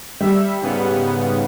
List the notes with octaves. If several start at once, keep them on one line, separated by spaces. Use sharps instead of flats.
G3 E5
G#2 C#3 B3